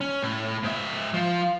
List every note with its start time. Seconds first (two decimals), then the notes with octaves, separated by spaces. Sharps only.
0.01 C#4
0.23 A2
0.64 G#2 E5
1.14 F3